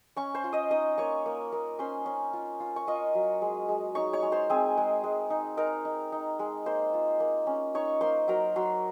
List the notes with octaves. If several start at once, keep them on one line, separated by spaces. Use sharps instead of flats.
C#4 C#5 C#6
C5 C6
F4
D#5 D#6
D#4 D#5 D#6
A#3 C#5 C#6
A#3
A#3
C#4 C5 C6
C#4
F4
F4
C#6
F4 D#5 D#6
F#3
G#3
G#3
D#4 C#5 C#6
C#5 C#6
G#3
C5 C6
C4 G#4 G#5
G#3
G#3
D#4
D#4 A#4 A#5
D#4
D#4
G#3
A#3 C5 C6
F4
A#3
C#4
D#4 C#5 C#6
A#3 C5 C6
F#3 A#4 A#5
F#3 C5 C6